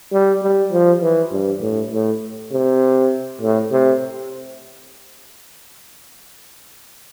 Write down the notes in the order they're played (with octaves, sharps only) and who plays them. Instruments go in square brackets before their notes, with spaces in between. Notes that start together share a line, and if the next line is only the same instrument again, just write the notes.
[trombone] G3
G3
F3
E3
G2
A2
A2
C3
A2
C3